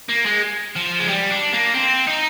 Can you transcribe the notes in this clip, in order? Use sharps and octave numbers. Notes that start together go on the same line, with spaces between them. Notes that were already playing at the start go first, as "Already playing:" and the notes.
A#3
G#3
F3
G#3
G3
D4
A#3
C4
D#4